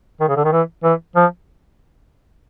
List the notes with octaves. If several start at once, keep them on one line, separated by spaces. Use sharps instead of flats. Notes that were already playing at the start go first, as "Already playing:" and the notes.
D#3
C#3
D3
D#3
E3
E3
F3